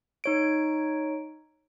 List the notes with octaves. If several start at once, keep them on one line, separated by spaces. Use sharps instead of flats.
D#4 C#5 D7